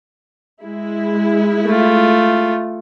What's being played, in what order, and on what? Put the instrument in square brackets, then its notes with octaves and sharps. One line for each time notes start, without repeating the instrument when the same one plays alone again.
[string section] G#3 E4
[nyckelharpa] A3 F4